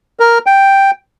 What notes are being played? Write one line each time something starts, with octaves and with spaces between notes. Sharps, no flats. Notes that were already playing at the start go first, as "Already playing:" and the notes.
A#4
G5